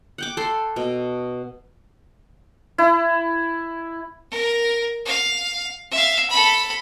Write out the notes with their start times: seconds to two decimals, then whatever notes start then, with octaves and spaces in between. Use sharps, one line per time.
0.18 F#5 G5 D6
0.37 A4 C6
0.76 B2
2.78 E4
4.31 A#4
5.06 F5
5.91 E5 F5
6.30 A4 B5